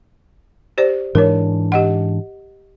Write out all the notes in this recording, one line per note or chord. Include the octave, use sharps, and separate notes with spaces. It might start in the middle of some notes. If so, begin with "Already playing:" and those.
G4 C5 D5
G#2 E3 D4 A#4 C#5
G4 D#5 F#5